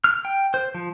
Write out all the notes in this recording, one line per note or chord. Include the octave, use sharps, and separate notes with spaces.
F6
G5
C5
F3